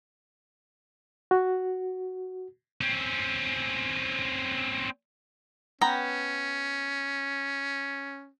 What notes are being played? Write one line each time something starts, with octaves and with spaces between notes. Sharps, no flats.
F#4
C4 C#4
B3 C#4 G5 A#5